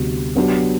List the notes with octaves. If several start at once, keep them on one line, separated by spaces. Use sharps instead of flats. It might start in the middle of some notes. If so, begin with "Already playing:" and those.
Already playing: D2 C3 G3 B3 F#4
F#3 B3 D4 G4